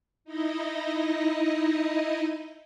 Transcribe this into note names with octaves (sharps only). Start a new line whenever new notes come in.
D#4 E4 D#5